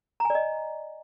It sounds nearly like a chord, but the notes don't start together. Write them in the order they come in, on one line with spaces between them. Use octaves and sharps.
A#5 G#5 D5 D#5